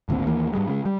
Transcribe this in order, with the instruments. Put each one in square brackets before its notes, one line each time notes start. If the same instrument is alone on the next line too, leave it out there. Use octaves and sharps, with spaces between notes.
[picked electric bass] G#1 D2 A#2 C4
D#2 E3 A#3
G#2 G3 G#3
C#3 G#3
G3